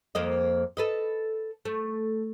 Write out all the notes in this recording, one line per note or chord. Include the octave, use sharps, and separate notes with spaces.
F2 A#3 D#5
A4 B4 D#5
A3